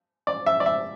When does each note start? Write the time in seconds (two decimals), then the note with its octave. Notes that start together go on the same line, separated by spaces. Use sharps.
0.27 D5
0.46 E5
0.60 D5
0.66 E5